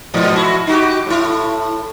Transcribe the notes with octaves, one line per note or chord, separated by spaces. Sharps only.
G#2 B2 F3
E4 F#4
D#4 F#4 G4
A2 E4